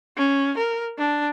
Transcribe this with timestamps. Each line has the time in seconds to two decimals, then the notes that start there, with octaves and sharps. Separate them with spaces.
0.18 C#4
0.58 A#4
0.98 D4